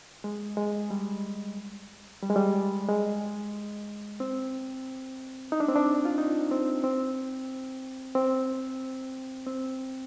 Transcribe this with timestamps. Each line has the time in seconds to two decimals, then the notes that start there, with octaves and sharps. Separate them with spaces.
0.24 G#3
0.57 G#3
0.91 G3
2.22 G3
2.29 G#3
2.36 G3
2.89 G#3
4.20 C4
5.52 D#4
5.60 D4
5.68 C4
5.76 D4
6.05 F4
6.18 D#4
6.51 C4
6.84 C4
8.15 C4
9.47 C4